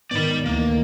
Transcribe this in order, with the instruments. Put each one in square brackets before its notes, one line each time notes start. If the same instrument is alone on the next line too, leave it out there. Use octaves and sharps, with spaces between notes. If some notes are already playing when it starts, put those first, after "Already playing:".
[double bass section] G#2 D#3 [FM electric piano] B3 A6 [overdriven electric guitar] D5 B5
[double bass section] D2 D#3 E3 [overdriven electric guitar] A#3